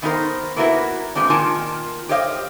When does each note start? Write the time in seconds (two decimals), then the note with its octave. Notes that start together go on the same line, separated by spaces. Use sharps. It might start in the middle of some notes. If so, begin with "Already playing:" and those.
0.02 D#3 B3 D#4 F#4 A#4 C5
0.56 A#3 B3 E4 F#4 A#4 B4
1.15 E3 G#3 A#3 C4 D4
1.30 A#2 D#3 F4 A#4 G#5 A5
2.09 G4 C5 C#5 D#5 F5